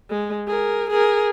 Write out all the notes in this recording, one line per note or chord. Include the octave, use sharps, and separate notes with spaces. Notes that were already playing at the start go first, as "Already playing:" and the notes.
G#3
G#4 A#4
G#4 A#4